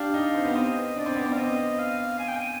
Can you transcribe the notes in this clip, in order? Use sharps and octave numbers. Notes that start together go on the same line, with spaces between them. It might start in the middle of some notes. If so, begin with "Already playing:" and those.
Already playing: D4 G4 F5
D#4
C4
B3
C4 D#5
D4 D5
C4
B3
C4
F5
C4 D#5
F5
G#5
G5
G#5